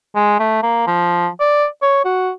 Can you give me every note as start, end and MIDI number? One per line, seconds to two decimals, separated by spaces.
0.15 0.39 56
0.40 0.62 57
0.63 0.85 58
0.87 1.28 53
1.40 1.66 74
1.83 2.02 73
2.05 2.31 66